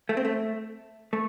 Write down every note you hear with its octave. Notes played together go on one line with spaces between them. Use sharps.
A3
C4
A3
A3